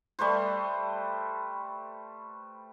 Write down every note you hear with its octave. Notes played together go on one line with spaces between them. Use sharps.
G3 A3 B4 C5